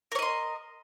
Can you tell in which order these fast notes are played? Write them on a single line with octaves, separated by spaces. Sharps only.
A#4 C#5 D#5 C6